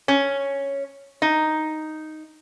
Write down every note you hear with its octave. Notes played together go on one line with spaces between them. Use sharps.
C#4
D#4